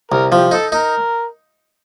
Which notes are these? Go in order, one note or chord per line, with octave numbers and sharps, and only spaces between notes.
C2 A#4
F3 G4
D#4 A4
D#4 A#4